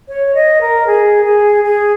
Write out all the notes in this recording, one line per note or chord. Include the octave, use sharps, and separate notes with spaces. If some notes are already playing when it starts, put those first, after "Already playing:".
C#5
D#5
A#4
G#4
G#4
G#4